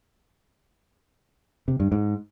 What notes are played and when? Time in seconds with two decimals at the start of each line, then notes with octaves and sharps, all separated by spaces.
1.68 C3
1.80 G2
1.92 G#2